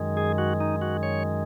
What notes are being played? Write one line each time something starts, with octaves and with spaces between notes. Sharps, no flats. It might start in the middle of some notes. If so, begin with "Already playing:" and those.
Already playing: F#2 D#3 G#3
G#4
F#4
D#4
F#4
C#5